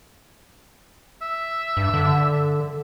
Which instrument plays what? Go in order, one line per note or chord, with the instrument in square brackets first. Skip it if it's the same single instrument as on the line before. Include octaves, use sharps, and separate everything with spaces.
[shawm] E5
[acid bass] G2
D3